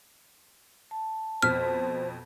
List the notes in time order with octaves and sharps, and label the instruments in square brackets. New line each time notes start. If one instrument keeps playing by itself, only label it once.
[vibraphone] A5
[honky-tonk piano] F2 B2 B6 [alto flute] C5 [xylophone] F6